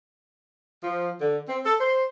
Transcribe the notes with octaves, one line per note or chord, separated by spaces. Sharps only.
F3
D3
C4
A4
C5